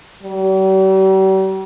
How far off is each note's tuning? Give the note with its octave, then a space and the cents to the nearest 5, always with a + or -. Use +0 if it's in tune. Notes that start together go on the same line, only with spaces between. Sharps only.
G3 -45